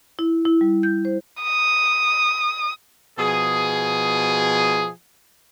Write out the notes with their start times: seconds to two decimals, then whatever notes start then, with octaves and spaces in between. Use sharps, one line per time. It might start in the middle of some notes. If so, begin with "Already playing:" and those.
0.19 E4
0.45 E4
0.61 G3
0.83 G6
1.05 C5
1.43 D#6
3.19 B2 F3 G#4